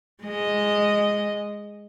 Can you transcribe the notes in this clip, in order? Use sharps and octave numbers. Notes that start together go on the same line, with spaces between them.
G#3 D#5